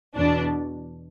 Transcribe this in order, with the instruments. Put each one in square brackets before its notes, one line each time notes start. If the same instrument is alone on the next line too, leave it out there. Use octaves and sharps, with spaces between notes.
[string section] E2 B2 D4